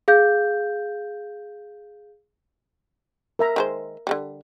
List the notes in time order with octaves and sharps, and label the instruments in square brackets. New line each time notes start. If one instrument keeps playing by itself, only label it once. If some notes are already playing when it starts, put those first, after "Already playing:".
[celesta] G#4 F5 G6
[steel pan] A#4 E5 A#5
[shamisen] D#3 G#3 C5
D3 D#3 G3